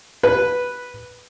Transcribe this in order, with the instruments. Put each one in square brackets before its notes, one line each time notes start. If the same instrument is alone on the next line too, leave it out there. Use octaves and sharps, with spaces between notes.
[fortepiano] B4